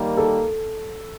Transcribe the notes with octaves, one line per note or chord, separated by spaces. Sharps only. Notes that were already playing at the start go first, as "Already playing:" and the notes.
Already playing: D#3 G3 A#3
A4